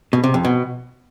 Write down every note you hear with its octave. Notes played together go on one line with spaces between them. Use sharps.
B2
C3
F2
B2